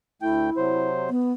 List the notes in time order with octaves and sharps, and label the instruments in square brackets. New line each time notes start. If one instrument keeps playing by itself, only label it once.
[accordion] D2 A3 G5 [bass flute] E4
[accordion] C3 F#3 C5
[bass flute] B3